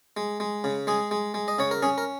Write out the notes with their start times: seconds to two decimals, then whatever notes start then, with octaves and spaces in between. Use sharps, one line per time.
0.17 G#3
0.40 G#3
0.64 C#3
0.87 G#3 G#4
1.11 G#3
1.34 G#3
1.48 D#5
1.58 C#3 C#5
1.71 A#4
1.83 C#4 G#4
1.98 A#4